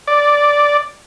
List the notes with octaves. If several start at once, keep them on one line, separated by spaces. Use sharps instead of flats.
D5